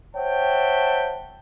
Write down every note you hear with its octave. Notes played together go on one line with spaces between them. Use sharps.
C5 C#5 E5 F#5 G5 A5